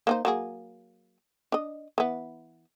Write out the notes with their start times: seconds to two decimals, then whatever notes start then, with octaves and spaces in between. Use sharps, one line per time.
0.07 A#3 D#4 C5
0.25 F#3 A#3 G#4
1.52 D4 D#5
1.98 E3 B3